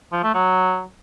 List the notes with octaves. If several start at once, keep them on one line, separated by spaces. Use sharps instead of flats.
F3
A3
F#3